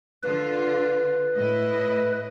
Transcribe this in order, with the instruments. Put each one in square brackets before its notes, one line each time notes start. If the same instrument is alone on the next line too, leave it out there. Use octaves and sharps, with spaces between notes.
[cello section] D3 F4 [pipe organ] B4
[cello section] A2 E4 D#5